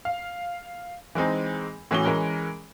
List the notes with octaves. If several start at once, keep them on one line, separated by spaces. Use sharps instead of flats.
F5
E3 G#3 C4 D#4
A2 E3 C#4 F#4 G7
E3 G#3 C#4 A#4